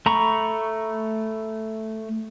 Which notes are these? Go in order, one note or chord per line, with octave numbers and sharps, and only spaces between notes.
A3 A#5 B5 C#6